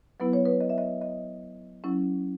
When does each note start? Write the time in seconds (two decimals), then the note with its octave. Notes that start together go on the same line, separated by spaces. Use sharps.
0.20 F#3 B3 E4 B4
0.33 C#5
0.46 B4
0.61 D#5
0.70 E5
0.78 D#5
1.02 D#5
1.84 F#3 C#4 E4